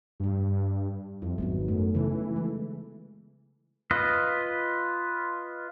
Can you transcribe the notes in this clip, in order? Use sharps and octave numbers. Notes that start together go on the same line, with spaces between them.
G2 G3 G4
F2 E4
G#1 F#3 B3 D#4
F#2 G#3 A3
C#3 E3 A4
G#3
F4 B4 D#5